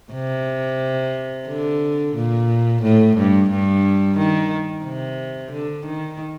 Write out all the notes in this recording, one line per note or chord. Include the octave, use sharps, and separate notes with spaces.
C3
D3
A#2
A2
G2
G2
D#3
C3
D3
D#3